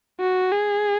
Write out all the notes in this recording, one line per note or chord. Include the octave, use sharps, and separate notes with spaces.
F#4
G#4